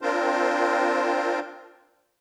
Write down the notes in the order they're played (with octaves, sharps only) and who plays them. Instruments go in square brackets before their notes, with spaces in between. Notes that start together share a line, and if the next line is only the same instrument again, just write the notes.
[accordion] C4 D4 F4 A#4 C5